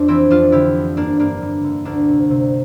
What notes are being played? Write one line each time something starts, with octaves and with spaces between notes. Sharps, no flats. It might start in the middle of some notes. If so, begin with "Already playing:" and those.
Already playing: F2 D4
E3 C4 E4
F2 D4 F4
D3 E4 G4
F3
G2 A#3 D4
G2 A#3 D4
G2
D3
D2 A#3 D4
C3
C3